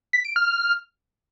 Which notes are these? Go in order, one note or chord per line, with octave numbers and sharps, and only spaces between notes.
B6
D7
F6